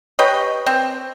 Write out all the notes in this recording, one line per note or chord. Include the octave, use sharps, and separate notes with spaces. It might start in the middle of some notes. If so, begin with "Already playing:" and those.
G4 B4 C#5 D#5
C4